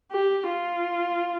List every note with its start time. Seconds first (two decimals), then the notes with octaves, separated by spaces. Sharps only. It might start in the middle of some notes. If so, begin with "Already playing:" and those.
0.11 G4
0.48 F4